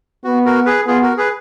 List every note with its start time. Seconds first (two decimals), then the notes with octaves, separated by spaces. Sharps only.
0.24 B3 F#4
0.45 F#4 A#4
0.66 G#4 B4
0.86 B3 F4 G#4
1.02 F#4 A#4
1.18 G#4 B4